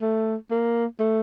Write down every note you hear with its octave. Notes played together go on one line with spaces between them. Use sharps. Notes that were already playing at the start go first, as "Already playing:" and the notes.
A3
A#3
A3